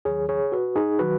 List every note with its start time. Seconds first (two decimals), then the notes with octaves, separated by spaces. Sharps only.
0.05 D#2 D#3 F#3 G#4 C#5
0.29 G#4 C#5
0.52 F#4 B4
0.76 D#4 G#4
0.99 D#3 F#3 F#4 B4